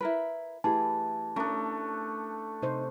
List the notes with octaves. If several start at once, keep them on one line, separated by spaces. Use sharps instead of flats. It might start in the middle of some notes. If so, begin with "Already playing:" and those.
E4 A#4 B4
E3 A3 E4 G4 G#4 A5
A3 C#4 D4 A#4
C3 D#4 C5